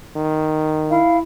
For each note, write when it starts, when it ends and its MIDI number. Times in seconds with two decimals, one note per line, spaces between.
0.16 0.99 51
0.90 1.21 64
0.90 1.17 77